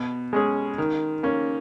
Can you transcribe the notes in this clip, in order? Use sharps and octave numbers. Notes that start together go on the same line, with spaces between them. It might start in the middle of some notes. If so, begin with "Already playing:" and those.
Already playing: B2
G#3 C#4 G#4
D#3
A#3 C#4